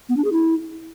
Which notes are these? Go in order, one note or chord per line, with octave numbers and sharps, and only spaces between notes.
B3
D4
G#4
E4